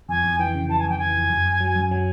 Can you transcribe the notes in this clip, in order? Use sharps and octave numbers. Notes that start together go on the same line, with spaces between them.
F2 G#5
F2
E3 G5
C#3
E3 A5
G#5
F2 G5
E3 G#5
F2
F#2
F#2
F#3
F#2
F#3 G#5